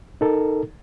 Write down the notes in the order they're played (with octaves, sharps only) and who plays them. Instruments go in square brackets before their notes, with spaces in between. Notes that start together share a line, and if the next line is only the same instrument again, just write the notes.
[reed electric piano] D#4 A4 A#4